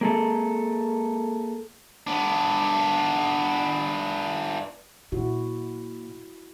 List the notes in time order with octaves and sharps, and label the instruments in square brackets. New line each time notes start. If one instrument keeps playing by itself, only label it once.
[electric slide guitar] A#3 G#4 A4
[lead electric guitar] B3 D4
[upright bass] A#2 [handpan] E4 F#4